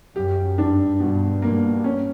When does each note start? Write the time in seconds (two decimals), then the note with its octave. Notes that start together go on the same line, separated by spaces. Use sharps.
0.16 F#2 G4
0.58 G2 D4
1.00 G2 B2
1.42 G2 A#3
1.84 C#4